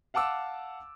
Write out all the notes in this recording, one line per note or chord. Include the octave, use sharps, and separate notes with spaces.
F5 F#5 A5 D6 E6